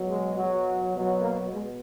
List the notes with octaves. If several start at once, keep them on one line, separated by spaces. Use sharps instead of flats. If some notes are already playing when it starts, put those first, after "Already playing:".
Already playing: B2 F#3
G#3
B2 F#3
B2 F#3
A#3
B2 G#3